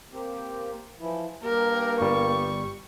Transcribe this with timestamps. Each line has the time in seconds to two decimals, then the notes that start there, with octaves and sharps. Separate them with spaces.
0.12 A#3 C4 G4
1.00 E3 F3 E4
1.44 G2 A#3 G4 A#4
2.01 G1 G3 C#6